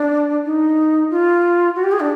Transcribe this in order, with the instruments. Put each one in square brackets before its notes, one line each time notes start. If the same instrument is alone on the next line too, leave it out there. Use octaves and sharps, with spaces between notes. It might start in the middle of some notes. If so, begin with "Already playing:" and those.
Already playing: [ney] D4
D#4
F4
F#4
G4
G#4
D4